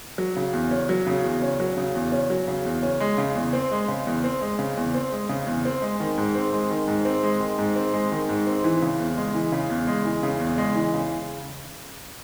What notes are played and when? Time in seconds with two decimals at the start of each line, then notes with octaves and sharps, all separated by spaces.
0.18 F#3
0.37 C#3
0.53 E2
0.71 C#4
0.89 F#3
1.07 C#3
1.24 E2
1.42 C#4
1.60 F#3
1.77 C#3
1.95 E2
2.12 C#4
2.30 F#3
2.48 C#3
2.65 E2
2.83 C#4
3.00 G#3
3.18 C#3
3.35 E2
3.53 C4
3.71 G#3
3.88 C#3
4.07 E2
4.24 C4
4.41 G#3
4.59 C#3
4.77 E2
4.94 C4
5.12 G#3
5.29 C#3
5.47 E2
5.65 C4
5.82 G#3
6.00 D#3
6.18 G#2
6.35 C4
6.53 G#3
6.70 D#3
6.87 G#2
7.05 C4
7.23 G#3
7.40 D#3
7.58 G#2
7.76 C4
7.94 G#3
8.12 D#3
8.29 G#2
8.47 C4
8.64 E3
8.82 C#3
8.99 E2
9.17 G#3
9.35 E3
9.52 C#3
9.70 E2
9.87 G#3
10.05 E3
10.23 C#3
10.40 E2
10.58 G#3
10.76 E3
10.94 C#3